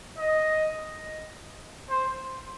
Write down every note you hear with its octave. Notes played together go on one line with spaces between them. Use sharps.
D#5
C5